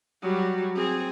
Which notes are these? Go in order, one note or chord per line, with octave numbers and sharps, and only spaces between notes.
F#3 G3
C4 G#4